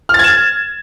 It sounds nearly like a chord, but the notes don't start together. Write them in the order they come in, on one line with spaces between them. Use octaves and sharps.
F6 A6 G#6 E7